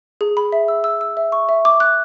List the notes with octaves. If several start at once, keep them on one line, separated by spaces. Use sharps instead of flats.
G#4
B5
E5
E6
E6
E6
E5
C#6
E5
D6
F#6